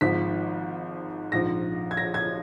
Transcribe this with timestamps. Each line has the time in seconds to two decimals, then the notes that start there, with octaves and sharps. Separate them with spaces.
0.01 G#1 G#2 F3 B6
1.32 A#1 G#2 F3 A#6
1.91 G#6
1.97 A#6
2.14 G#6